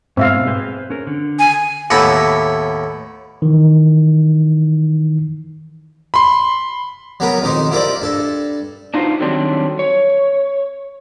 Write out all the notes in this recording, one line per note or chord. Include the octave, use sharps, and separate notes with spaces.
G#2 B2 G#3 C4 E5 F5
G#4 B4 C5
C#4 A#4
D3
G#5
D#2 A2 B3 E5
D#3 E3
B5 C6
F#3 B3 G4 A#4 B4
F2 D#3 D#4 G4 C5
E4 F4 G4 A#4 C5 D5
G2 A4
D4 D#4 F4 F#4 B4 C5
D3 D#3 F#3 G3 C4 D4
C#5